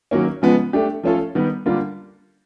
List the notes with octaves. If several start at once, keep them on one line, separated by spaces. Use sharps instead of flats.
D#3 F#3 A#3 C#4
C#3 F3 G#3 B3
A3 D4 G4
F3 A3 C#4 F4 A4
D#3 G3 B3
D3 G3 A#3 D4 F4